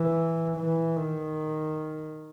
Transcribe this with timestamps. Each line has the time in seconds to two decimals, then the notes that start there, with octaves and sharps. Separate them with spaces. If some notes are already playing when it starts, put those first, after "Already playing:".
Already playing: E3
0.57 E3
0.96 D#3